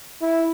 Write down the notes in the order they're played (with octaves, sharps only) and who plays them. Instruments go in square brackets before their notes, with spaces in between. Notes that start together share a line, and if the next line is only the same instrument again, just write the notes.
[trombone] E4